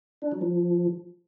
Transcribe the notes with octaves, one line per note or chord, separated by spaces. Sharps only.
D4
F#3
F3